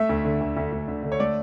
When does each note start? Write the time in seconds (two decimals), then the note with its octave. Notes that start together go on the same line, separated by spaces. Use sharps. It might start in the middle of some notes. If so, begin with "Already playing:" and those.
Already playing: A3 E5
0.09 D2
0.25 D3
0.41 D2
0.57 D2
0.72 D2
0.88 D3
1.03 D3
1.12 C#5
1.20 A3 D5